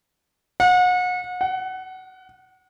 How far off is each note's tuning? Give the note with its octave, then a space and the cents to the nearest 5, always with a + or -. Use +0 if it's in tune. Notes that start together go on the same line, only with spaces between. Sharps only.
F#5 -35
F#5 +20